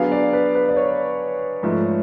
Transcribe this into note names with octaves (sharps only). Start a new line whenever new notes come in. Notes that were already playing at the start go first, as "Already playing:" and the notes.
Already playing: F#3 B3 D4 G#4 F5
D5
B4
B4
D5
C#5
G#2 F3 A3